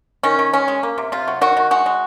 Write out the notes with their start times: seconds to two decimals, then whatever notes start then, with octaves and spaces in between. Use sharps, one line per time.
0.23 D#3 C#4
0.39 D#3
0.53 G#3 C#4
0.68 G#3
0.83 A#3
0.98 C3
1.12 C3 F4
1.28 F#3
1.41 D#3 F#4
1.57 D#3
1.71 G#3 F#4
1.86 G#3